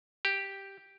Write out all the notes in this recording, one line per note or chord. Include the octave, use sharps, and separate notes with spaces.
G4